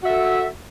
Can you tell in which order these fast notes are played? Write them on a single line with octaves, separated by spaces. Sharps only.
F#4 E5 A4